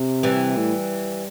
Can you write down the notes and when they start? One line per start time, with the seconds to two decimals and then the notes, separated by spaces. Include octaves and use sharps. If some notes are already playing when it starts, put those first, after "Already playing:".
Already playing: C3
0.23 E3 G3
0.57 A2